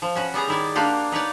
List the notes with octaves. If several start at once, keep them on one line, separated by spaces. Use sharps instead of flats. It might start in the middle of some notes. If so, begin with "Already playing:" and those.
F3
C#4 F#4 B4
G3 B3 G#4 A#5
D#3 E4 D5
A#3 D4 F4 G4 F#5
D#4 B4 C#5 D5